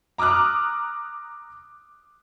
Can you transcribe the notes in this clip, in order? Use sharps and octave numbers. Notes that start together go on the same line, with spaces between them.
A#5 D6 D#6 F6 F#6